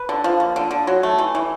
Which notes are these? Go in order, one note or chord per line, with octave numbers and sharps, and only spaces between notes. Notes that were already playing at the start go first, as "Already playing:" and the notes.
Already playing: B4
D3
F3
A#3
D3
D3
F#3
A3
E3
E3